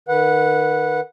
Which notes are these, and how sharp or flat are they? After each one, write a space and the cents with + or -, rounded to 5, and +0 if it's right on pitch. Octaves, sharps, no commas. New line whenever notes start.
D#3 -30 B4 -10 F#5 -20